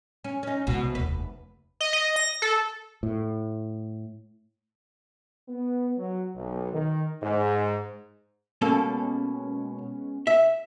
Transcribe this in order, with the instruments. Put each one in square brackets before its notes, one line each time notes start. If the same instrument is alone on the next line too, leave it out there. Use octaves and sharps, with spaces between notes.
[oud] C#4
C#4 D#4
[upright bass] C2 G#3 [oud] B2
[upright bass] F1 D#2 [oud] B4
[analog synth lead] D#5
D#5
A#6
A4
[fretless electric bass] A2
[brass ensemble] B3
F#3
B1
D#3
G#2
[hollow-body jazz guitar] B2 A#3 A4 [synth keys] G#3 B3 C#4
[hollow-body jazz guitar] E5